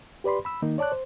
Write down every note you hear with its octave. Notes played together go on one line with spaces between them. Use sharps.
G4 B4 D5 B5 C6
B5 E6
D#3 A#3 D#4
C#5 D5 A5 D6 F#6
C5